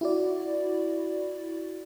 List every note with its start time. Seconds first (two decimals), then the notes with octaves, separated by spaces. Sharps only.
0.01 E4 F#4 D5